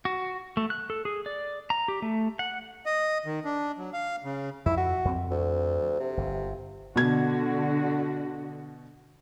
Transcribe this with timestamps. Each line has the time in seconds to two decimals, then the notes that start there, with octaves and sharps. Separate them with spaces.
0.05 F#4
0.57 A3
0.70 F#6
0.90 A4
1.05 G#4
1.26 D5
1.70 A#5
1.88 G4
2.02 A3
2.39 F#5
2.86 D#5
3.26 D#3
3.45 D4
3.78 F#3
3.93 F5
4.24 C#3
4.66 F2 E4
4.77 F#4
5.05 F2 C4
5.31 D2
6.00 C3
6.17 G1
6.96 B2 D3 F#4 G#6